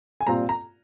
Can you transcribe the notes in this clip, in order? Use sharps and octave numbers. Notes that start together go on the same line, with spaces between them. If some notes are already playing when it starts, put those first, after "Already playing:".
G#5
A#2 G3 C4 F4 A#5
A#5